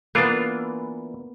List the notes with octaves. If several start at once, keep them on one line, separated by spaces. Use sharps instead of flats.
E3 A#3 B3 D4 F4